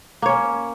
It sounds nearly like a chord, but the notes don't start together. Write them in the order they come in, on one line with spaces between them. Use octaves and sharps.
A#3 C#5 C#4